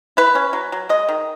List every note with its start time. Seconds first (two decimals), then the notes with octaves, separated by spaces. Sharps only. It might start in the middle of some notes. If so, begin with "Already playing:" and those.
0.17 E4 B4
0.35 C#4
0.53 F#3
0.72 F#3
0.89 G#3 D#5
1.09 D#3